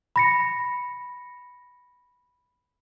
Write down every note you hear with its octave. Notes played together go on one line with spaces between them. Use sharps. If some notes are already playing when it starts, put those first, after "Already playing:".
B5 A#6 C#7